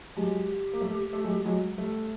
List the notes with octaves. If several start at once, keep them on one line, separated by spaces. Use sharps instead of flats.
F#3 G#3 G4
A#3
G3 A3
A3
F#3 G#3
F#3 G#3
G3 A3